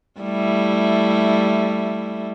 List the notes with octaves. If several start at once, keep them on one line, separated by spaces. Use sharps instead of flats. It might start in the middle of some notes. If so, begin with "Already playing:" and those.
G3 A3 E4